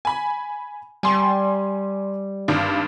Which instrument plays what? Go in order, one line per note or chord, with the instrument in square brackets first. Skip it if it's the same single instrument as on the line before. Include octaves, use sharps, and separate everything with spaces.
[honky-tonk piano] G#5 B5
[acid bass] G3 [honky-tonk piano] G#5 C6
[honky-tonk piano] G#1 G2